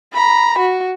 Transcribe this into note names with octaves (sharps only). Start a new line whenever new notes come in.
A#5 B5
F#4